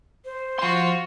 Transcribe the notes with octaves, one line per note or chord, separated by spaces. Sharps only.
C5
F3 F4 F#4 C6